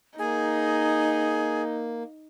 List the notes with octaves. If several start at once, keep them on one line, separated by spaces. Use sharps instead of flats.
A#3 D#4 G#4